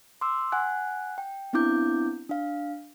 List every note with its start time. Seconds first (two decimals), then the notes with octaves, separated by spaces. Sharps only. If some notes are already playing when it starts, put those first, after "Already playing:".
0.21 C6 D6 E6
0.52 F#5 G#5 F#6
1.18 G5
1.53 B3 C4 D4 E4 D6 G6
2.29 D4 F5